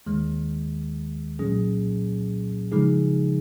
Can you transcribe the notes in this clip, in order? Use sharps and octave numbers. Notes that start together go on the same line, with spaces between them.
D#2 D#3 G#3
C2 A#2 F#3 C#4 G#4
C#3 F3 G#3 D#4 G#4